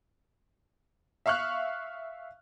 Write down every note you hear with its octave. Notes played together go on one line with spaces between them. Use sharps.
E5 F5 C#6 F6 F#6